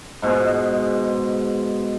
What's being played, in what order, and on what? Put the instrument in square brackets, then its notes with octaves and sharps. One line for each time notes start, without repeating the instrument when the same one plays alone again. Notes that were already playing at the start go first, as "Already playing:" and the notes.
[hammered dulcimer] G#2 B2 G#3